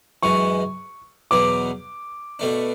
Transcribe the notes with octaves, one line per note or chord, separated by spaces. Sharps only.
F#2 E3 G#3 C#6
E2 B2 F#3 B3 D6
B2 A3 D4